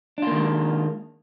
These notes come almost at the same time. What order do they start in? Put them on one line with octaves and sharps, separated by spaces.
D4 F4 A#3 D#3 G#3